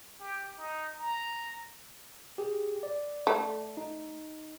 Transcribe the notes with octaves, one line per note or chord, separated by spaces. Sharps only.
G4
D#4
A#5
G4 G#4
D5
A3
D#4